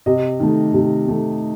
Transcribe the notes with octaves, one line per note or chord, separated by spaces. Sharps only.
C3 D#5
D#3 A3
C3
D#3 A3